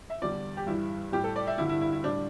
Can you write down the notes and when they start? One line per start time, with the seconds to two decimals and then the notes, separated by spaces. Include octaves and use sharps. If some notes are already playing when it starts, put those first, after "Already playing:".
0.10 E5
0.22 E2 D3 G3 D5
0.57 G4
0.67 G2 E3 G3 E4
1.12 A2 G3 G4
1.24 A4
1.36 D5
1.47 E5
1.58 G2 D3 G3 E4
1.69 E4
1.81 E4
1.92 E4
2.04 A2 G3 D4